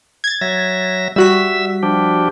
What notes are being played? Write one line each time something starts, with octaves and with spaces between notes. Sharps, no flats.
G#6 A6
F#3 E5 A#6
G3 F#4 E5 E6 B6
F3 D4 G4